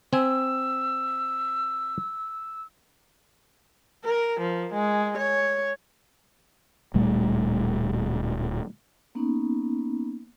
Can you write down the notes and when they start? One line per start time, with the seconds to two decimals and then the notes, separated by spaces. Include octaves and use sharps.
0.13 C4 G#5 E6
4.05 A#4
4.40 F3
4.74 G#3
5.18 C#5
6.94 D1 A#2 G3 A3
9.15 A#3 B3 C#4 D#4